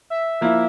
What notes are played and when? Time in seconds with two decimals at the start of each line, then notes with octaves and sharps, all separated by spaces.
0.10 E5
0.41 F3 A#3 E4